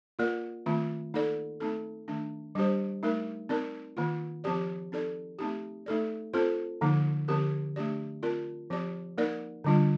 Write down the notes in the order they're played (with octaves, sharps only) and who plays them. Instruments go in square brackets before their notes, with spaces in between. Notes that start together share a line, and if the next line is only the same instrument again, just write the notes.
[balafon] A#3 F4 A#4 D5
D#3 A3 C4 F4
A#3 D#4 A4 D5
A3 C4 D#4 A4
D#3 A3 D4
G3 D4 G4 C5
A3 D#4 A#4
C4 D#4 A#4 D5
D#3 A#3 F4
F3 C4 G4 D5
C4 D#4 A4 D5
A3 C4 D#4 G4
A3 D#4 A4 D5
C4 F4 A4 C5
D3 F3 A#3 D#4
D3 F3 C4 G4 A#4
A3 D4 G4 D5
C4 F4 A#4 D5
F3 C4 G4 D5
A#3 D#4 A#4 D5
D3 G3 D4 F4